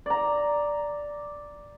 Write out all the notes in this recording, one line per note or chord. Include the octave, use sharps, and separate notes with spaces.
D5 A#5